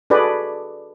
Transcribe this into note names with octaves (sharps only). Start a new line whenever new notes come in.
D4 F#4 G#4 A4 B4 D5